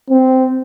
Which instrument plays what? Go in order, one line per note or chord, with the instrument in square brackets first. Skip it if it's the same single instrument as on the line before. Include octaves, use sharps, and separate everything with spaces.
[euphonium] C4